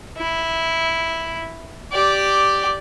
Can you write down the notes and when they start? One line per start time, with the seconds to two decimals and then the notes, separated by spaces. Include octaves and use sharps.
0.18 E4
1.93 G4 D5